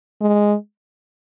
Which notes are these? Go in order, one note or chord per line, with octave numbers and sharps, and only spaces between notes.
G#3